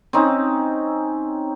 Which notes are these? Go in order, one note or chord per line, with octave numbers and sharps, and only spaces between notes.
C4 C#4 D#4